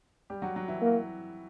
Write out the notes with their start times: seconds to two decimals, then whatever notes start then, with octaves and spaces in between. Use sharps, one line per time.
0.30 G3 G4
0.42 F#3 F#4
0.56 F#3 F#4
0.68 E3 E4
0.82 A#3